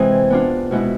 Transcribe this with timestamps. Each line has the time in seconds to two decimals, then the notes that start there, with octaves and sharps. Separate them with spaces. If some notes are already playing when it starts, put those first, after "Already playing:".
Already playing: C3 E3 G#3 C4 G#4
0.30 B3 D4 F4
0.71 B2 G#3 B3 E4